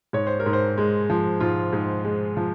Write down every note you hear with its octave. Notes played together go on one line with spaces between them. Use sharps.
G#2 C#5
C5
A#4
G#2
C5
G#3
F3
G#2 F4
G#2
G#3
F3